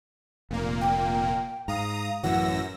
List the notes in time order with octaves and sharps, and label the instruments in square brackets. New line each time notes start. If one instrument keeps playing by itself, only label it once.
[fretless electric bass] F1 [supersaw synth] A#2 A#3
[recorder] G5
[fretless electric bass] G#2 [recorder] F5 [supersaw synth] A#5 D#6
[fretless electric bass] A1 E3 F#3 [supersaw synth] F#2 E6 A#6 [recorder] F#5